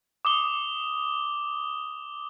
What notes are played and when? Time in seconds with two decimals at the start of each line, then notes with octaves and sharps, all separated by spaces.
0.25 D6 D#6 G7